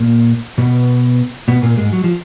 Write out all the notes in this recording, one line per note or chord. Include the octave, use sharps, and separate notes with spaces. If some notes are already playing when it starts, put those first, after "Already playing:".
Already playing: A#2 A#3
B2 B3
B2 B3
A#2 A#3
G#2 G#3
F#3
F3